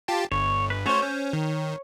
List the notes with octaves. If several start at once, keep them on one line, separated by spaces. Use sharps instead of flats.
F4 G4 A5
G1 C#5
B4
A3 C#4 F#4 C5 C#5
C#4 C5 G6
D#3 C#5